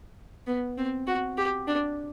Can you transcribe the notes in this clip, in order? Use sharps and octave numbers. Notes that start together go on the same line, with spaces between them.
B3
C4
F#4
G4
D4